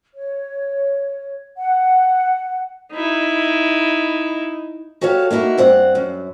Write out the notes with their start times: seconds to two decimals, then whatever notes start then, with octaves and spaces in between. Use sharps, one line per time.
0.15 C#5
1.57 F#5
2.93 D#4 E4
5.01 F#4 G4 A4 C#5 F5
5.31 A#3 D#4 E4 F#4
5.58 G2 C4 F#5
5.95 F#2